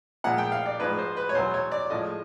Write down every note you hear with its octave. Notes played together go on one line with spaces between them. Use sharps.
A#2 F3 G#3 F#5
G5
F5
D5
G#2 F3 G#3 B4
C5
B4
C#5
E2 B2 F#3 C5
C#5
D5
A2 F3 G#3 D#5